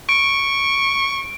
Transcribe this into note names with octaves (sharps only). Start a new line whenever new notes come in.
C#6 D7